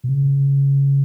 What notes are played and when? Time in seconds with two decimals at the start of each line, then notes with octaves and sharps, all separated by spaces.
0.04 B2
0.09 C#3